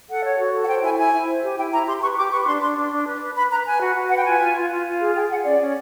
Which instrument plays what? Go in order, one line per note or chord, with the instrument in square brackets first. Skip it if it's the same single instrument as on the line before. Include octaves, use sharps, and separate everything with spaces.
[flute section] A4 F#5
C#5
F#4
A4
F#5
C5 G5
E4 G#5
E4 G#5
E4
C5
G4
E4 G5
E4 A#5
G4 C6
B4 C#6
G4 D6
B4 C#6
D4 C6
D4 C6
D4
D4
B4
B4
B4 B5
B4 A#5
B4 G#5
F#4
F#4
B4 F#5
G5
F4 G#5
F4
F4
F4
F4
G#4
G#4 G5
G#4 F#5
C#4 D5
C#4